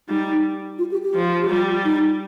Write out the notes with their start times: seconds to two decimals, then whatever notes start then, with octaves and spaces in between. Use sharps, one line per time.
0.09 G3 D#4
0.79 F4
0.91 G4
1.03 G4
1.15 F3
1.42 G4
1.49 G3 F4
1.85 D#4